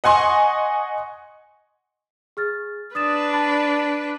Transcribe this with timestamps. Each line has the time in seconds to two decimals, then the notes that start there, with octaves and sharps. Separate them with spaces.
0.04 D#5 F#5 G#5 C6 C#6
2.37 G#4 F6 A6
2.95 D4 B4 D#6 A6 E7
3.33 A5 B5 A6